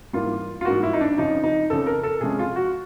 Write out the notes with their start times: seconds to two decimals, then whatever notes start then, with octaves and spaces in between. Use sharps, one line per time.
0.13 G#2 E3 G3 A#3 F4
0.61 F4
0.65 G#2 E3 G3 A#3 F#4
0.83 E4
0.93 D#4
1.01 D4
1.18 F2 C#3 F3 D#4
1.43 D#4
1.70 F2 C#3 F3 A4
1.86 A#4
2.03 A4
2.21 C3 F3 G#3 C#4 G#4
2.39 F4
2.56 F#4